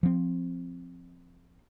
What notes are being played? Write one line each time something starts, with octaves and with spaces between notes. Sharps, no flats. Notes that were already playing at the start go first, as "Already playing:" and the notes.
F3 C4